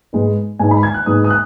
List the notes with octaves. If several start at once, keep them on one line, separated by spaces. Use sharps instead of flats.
G#2 G#3 B3 D#4
G#2 G#3 B3 D#4 G#5
B5
G#6
F#6
G#2 G#3 B3 D#4 D#6
D#6
F#6